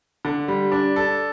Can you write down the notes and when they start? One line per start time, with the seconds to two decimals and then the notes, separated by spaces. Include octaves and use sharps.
0.25 D3
0.48 G3
0.72 D4
0.96 A4